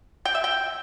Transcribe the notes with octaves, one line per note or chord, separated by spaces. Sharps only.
G5
E5
G5